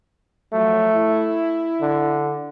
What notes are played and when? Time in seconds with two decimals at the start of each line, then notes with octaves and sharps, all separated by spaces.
0.53 F3 F#3 A3
0.95 E4
1.81 D3